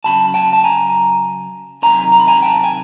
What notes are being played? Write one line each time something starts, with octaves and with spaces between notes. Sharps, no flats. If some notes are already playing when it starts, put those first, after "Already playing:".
C#3 F#3 A5 B5
G5 A5
A5
G#5 A#5
C3 D#3 F#3 G#5 A#5
A#5
B5
G#5 A#5
G5 A5
G#5